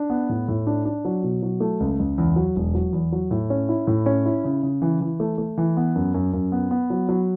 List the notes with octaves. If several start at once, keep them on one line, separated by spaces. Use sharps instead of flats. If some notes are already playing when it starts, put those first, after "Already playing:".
Already playing: D4
B3
A2
A2
D4
D4
F#3
B2
F#3
A3
C#2
C#2
E2
F#3
E1
F#3
E2
F#3
A2
C#4
E4
A2
C#4
E4
C#3
C#3
E3
E3
A3
A3
E3
B3
F#2
F#2
F#2
B3
B3
F#3
F#3